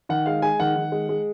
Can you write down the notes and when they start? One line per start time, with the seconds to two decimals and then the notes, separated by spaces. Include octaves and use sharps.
0.09 D#3 F#5
0.26 G#3 F5
0.42 G#3 G#5
0.60 D#3 F#5
0.76 D#3
0.92 G#3
1.09 G#3